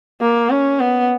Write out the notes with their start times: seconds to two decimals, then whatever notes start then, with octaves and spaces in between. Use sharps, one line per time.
0.21 A#3
0.50 C#4
0.80 B3